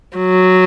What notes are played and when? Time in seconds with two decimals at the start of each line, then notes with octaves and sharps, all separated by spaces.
0.17 F#3